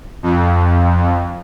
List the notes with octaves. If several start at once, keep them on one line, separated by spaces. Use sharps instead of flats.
F2